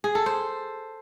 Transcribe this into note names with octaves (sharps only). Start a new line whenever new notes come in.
G#4
A4
C5